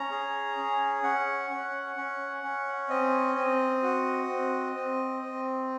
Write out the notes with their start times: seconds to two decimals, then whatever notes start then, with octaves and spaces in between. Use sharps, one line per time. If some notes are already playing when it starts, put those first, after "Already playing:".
Already playing: C#4 A#5
0.11 G#4
0.57 C#4
1.03 C#4 F#5
1.50 C#4
1.96 C#4
2.43 C#4
2.89 C4 D#5
3.36 C4
3.82 F#4
4.29 C4
4.75 C4
5.22 C4